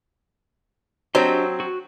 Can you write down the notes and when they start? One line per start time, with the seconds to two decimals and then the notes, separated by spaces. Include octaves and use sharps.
1.15 F#3 C4 D4 G4 C5 D#5
1.60 F#4